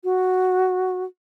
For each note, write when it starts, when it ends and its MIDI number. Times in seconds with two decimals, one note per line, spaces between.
0.04 1.04 66